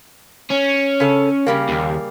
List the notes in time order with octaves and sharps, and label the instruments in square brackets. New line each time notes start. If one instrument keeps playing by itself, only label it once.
[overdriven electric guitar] C#4
[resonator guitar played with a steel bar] C#3 A4
C#3 G3 A#3
[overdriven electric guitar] D#2